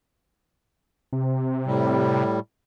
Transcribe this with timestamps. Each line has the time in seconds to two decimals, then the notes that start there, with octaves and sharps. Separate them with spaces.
1.13 C3
1.66 A2 G3